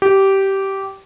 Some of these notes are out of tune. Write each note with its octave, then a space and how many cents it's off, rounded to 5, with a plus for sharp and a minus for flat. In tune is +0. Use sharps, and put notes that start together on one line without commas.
G4 -15